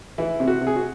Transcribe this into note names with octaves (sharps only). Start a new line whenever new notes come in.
E3 E4
C3
F#4
C3
G#4
F#4